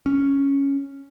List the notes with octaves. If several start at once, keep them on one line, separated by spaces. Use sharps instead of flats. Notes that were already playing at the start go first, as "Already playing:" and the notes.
C#4